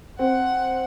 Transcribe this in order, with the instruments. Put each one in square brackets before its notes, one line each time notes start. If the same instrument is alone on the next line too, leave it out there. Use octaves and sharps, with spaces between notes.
[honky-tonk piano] C4 [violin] F#5